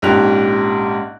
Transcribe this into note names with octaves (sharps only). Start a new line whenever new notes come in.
A#1 G#2 C#4 G4 F#6 F7